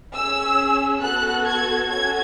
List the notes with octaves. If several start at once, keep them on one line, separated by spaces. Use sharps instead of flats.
C#4 G#4 E6
B3 F#4 A4 F#6
G#6
C#4 F#4 A4 G#6